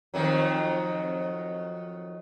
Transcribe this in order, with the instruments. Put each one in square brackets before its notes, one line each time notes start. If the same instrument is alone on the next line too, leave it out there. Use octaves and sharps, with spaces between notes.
[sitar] F2 D#3 F#3